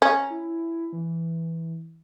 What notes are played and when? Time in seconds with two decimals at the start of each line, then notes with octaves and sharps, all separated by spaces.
0.02 C#4 A#5
0.30 E4
0.93 E3